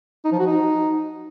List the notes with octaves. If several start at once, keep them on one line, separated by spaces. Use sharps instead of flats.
D#4
F3
F#4
D#4